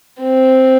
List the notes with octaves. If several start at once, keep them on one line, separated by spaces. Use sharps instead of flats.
C4